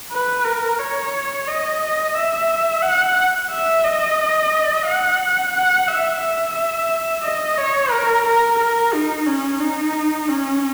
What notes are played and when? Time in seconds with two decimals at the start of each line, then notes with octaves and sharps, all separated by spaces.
0.12 B4
0.45 A#4
0.79 C#5
1.47 D#5
2.15 E5
2.82 F#5
3.50 E5
3.84 D#5
4.86 F#5
5.54 F#5
5.88 E5
6.22 E5
7.23 D#5
7.57 C#5
7.91 A#4
8.25 A#4
8.58 A#4
8.93 D#4
9.26 C#4
9.60 D#4
10.28 C#4